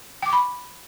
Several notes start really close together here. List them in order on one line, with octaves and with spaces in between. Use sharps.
G5 D6 C#6 B5